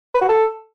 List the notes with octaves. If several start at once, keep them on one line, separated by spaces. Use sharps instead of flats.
B4
F#4
A4